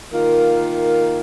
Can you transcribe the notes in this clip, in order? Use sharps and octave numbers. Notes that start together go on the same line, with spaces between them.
D#3 A#3 F4 A#4